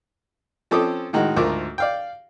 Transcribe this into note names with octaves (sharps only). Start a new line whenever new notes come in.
F3 C4 C#4 A4 D6 D#6
A2 D#3 G#3 F#4
D2 G#2 F4 A#4 D6
D5 F5 G5